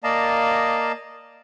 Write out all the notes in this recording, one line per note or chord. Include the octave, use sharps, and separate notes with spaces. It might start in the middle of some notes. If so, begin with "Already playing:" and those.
A#3 D5 D#5 F5 A5 A#5